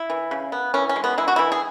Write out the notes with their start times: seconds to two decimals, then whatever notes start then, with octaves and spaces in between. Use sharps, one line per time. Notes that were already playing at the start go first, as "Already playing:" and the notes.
Already playing: E4
0.10 E3
0.31 C#3
0.52 B3
0.74 E3 C#4
0.89 C#4
0.96 G#3
1.04 B3
1.18 G#3 E4
1.28 F#4
1.36 E3 E4
1.52 G#4